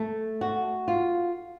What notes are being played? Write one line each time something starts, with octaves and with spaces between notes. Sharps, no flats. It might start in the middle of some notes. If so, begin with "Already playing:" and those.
Already playing: A3
F#4
F4